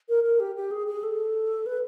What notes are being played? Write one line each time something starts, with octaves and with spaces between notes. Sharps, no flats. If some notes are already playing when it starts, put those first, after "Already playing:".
A#4
A#4
G4
G4
G#4
G#4
A4
B4